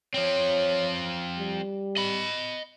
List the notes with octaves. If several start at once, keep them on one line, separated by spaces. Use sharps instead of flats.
F3 C4 C#5
G3
D#5 B5